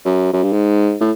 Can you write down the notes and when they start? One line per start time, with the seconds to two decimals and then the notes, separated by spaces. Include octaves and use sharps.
0.05 F#2
0.33 F#2
0.43 G2
0.52 G#2
1.01 A2